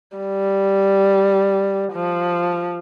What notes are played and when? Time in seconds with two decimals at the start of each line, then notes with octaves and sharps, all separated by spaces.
0.17 G3
1.93 F3